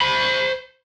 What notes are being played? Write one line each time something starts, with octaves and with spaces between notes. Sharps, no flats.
C5 B5